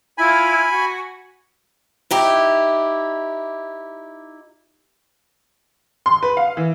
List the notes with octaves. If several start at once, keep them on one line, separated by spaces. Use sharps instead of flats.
E4 F4 G#5 B5
F#4
D#4 E4 G4
C6
B4
F5
E3